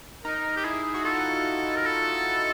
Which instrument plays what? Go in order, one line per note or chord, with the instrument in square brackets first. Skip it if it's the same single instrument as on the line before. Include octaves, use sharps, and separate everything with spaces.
[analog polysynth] D#4 [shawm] A#4
[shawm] G4
[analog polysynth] E4 [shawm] G#4
[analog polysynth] F#4
[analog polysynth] F4 [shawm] A4
[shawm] A#4
A4